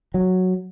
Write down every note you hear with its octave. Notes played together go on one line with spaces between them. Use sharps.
F#3